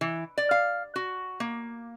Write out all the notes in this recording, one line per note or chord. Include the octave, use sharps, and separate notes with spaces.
E3
D5
F5
F#4
A#3